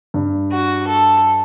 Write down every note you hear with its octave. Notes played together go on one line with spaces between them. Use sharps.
G2
F#4
A4